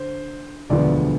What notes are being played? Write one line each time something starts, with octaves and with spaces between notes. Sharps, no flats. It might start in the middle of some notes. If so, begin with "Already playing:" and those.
Already playing: D3 C5
E1 D2 D3 F3 B3 D5